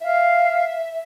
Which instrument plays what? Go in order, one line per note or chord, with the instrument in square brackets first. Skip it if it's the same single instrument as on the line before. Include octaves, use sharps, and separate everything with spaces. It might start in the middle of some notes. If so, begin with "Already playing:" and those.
[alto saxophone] E5 [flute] F5